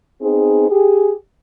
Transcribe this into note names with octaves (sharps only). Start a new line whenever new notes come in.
B3 C4 D#4 G#4
G4 G#4